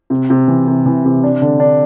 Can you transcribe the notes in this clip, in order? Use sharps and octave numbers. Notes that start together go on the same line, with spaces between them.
C3
C3
E3
C3
E3
C3
D4
D3
D4